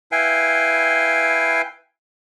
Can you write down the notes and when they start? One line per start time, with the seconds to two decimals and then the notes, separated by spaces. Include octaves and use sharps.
0.12 E4 B4 F5 G5 G#5